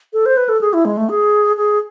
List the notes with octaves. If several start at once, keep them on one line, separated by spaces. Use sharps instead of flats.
A4
C5
B4
A4
G#4
E4
G#3
A3
G#4
G#4